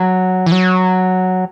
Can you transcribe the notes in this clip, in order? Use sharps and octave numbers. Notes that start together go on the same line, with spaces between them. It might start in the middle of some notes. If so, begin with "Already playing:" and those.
Already playing: F#3
E3
F#3